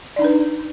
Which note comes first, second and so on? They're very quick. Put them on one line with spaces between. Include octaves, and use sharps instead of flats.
D5 D#4 D4 B4